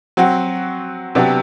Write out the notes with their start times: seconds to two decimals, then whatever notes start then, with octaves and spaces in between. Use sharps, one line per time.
0.17 F#3 C4 F#4
1.15 C3 F#3 B3 D4 G4